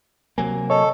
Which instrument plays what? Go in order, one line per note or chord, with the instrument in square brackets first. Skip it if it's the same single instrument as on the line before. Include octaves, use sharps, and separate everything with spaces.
[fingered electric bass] C3 F#3 A#3 [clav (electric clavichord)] G#5
[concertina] A4 [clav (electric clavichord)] C#5 [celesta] D#5